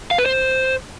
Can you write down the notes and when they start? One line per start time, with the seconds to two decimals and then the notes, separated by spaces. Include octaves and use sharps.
0.11 F5
0.18 B4
0.26 C5